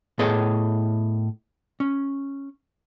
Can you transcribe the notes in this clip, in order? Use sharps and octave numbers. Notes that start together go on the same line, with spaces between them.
A2 B3 G#4 A4 C#5 D#5
C#4